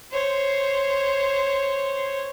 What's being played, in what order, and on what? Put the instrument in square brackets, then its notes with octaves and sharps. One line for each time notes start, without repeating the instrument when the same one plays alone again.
[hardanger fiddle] C5 C#5